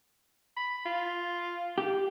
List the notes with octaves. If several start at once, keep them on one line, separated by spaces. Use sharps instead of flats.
B5
F4
G4